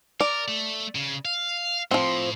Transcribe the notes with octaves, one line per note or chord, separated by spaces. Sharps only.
A#4 D5
A3
C#3
F5
A2 F3 C4